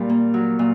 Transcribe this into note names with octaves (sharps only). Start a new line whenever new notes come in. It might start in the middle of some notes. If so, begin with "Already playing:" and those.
Already playing: A#2 G3
A#3
F#3
A#2